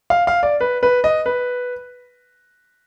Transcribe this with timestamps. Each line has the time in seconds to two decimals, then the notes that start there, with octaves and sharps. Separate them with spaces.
0.10 F5
0.27 F5
0.43 D5
0.61 B4
0.83 B4
1.04 D#5
1.26 B4